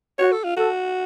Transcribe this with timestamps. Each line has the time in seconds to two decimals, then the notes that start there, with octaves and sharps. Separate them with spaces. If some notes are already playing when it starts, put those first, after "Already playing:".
0.18 F#4 C#5
0.32 A4
0.44 F4
0.57 F#4 A4